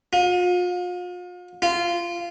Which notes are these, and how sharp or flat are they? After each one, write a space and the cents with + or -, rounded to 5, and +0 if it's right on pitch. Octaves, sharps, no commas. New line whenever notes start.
F4 +40
F4 -15